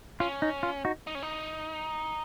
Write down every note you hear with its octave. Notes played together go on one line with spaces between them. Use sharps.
C#4 F4
D#4
F4
D#4 F#4
D#4
C#4
D#4